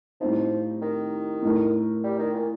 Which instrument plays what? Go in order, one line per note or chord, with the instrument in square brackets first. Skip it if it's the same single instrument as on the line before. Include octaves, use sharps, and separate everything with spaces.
[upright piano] A2 G3 C4 D#4 [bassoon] F3
[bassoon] D#3
[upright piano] A2 A3 D#4 A#4
[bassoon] G3
D#3
A#2